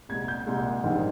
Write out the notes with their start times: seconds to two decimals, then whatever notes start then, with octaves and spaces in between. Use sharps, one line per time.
0.09 C2 A#2 G#3 G#6
0.28 G6
0.47 C2 A#2 G#3
0.84 A#1 G#2 D#3 G3